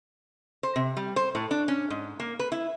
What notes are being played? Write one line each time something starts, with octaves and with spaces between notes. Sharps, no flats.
C5
C3
G3
C5
A2
D4
C#4
G#2
A#3
B4
E4